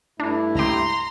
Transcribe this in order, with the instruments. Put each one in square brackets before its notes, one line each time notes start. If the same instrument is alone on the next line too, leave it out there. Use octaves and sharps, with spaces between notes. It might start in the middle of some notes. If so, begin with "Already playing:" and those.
[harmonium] G2 A3 E4 [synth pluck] D4
[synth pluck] C#2 G4 [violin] A#5 C6